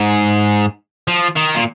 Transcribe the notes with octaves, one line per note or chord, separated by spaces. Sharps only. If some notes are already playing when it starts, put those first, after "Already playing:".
Already playing: G#2
F3
D#3
A#2